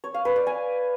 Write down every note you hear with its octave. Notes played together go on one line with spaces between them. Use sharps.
C#5
F5
B4
D5
G#5